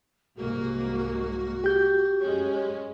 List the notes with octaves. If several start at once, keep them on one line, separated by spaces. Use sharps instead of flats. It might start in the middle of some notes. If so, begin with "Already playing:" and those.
C2 G#2 A#3 F#4
G4 G6
F#2 G#3 C#4